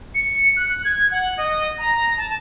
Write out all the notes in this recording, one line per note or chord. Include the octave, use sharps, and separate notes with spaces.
C#7
F#6
G#6
F#5
D#5
A#5
A5